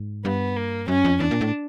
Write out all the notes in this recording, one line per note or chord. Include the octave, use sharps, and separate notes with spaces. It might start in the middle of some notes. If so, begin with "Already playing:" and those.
Already playing: G#2
G2 B3
A#3
F#2 C#4
F2
E2 D4
A#2
A2